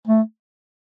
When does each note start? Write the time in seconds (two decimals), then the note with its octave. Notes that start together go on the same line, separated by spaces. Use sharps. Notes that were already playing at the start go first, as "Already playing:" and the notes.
0.08 A3